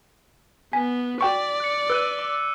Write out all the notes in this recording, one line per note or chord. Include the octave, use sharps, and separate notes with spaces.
B3 G#5 B6
F#4 D5 G5 C#6
F#6 C#7
B4 E6 F#6 D#7
D6